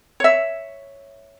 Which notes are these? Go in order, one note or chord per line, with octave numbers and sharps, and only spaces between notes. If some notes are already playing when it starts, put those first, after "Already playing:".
C#5 E5